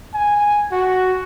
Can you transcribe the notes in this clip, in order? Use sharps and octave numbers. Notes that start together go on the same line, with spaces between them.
G#5
F#4